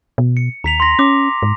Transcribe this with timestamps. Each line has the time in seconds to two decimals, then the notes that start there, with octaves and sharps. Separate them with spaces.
0.18 B2
0.37 C#7
0.64 D#2 A#5 B6 F7
0.80 C6 A#6
0.99 C#4 D6
1.42 G#2